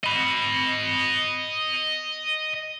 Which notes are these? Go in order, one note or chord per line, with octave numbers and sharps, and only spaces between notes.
D#5 B5